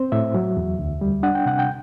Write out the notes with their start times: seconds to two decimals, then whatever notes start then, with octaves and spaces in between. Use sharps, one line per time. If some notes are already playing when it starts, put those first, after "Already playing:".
Already playing: C4 C5
0.12 A2 E5
0.34 F#3
0.57 E2
0.79 D2
1.01 G3
1.23 D4 F#5
1.35 G5
1.46 C3 F#5
1.59 G5